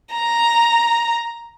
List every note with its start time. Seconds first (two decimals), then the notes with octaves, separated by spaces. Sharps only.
0.14 A#5